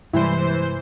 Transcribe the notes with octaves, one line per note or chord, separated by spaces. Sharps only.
G2 C3 E3 G3 G#3 E4 C5